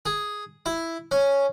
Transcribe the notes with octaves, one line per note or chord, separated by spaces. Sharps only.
G#4
E4
C#4